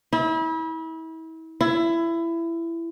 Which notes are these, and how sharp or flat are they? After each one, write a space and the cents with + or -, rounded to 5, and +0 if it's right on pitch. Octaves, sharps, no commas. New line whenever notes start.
E4 -35
E4 +20